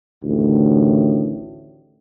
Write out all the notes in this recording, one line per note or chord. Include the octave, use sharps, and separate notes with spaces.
A1 D2 A2 D#3